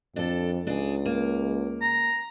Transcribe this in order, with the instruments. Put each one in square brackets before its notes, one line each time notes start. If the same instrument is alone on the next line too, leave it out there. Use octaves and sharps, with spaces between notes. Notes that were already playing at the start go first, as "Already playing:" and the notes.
[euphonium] F2 [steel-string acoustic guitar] D4 A4
[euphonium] C#2 [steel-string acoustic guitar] D4 G#4
[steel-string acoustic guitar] A#3
[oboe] A#5